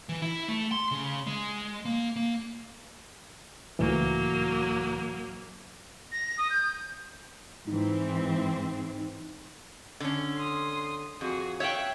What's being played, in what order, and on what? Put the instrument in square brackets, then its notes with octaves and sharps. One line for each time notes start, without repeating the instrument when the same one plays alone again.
[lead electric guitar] E3
E4
A3
C6
C#3
G#3
A#3
A#3
[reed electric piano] C#2 A2 E3 [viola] F#3 A#3
[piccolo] A#6
D#6
G6
[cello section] G#2 E3 C4 [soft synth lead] D#4
[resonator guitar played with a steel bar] D3 C#4
[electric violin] C6 D#6
[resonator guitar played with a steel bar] F2 [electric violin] F#4 G#4
[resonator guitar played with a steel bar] C#5 F5 G5 [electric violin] E5 F#6